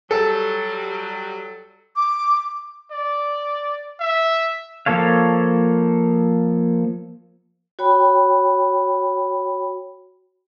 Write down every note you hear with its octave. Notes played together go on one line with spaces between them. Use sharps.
F#3 G3 A4
D6
D5
E5
F3 A#3 A4 C#5 F5
F#4 C#5 G5 B5